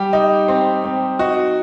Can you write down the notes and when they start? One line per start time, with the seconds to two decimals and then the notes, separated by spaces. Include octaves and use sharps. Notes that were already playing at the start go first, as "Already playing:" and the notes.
Already playing: G3 G4
0.13 D#4
0.48 C4
0.84 C4
1.19 D#4 F#4